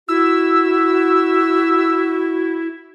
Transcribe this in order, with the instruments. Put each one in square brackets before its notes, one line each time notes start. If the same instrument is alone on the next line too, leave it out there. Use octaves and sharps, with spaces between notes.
[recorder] E4 [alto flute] F#4 [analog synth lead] E6